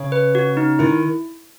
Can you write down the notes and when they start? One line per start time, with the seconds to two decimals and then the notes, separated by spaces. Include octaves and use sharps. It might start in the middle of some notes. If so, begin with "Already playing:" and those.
Already playing: C#3
0.12 B4
0.35 F#4
0.57 D#4
0.79 D#3 E4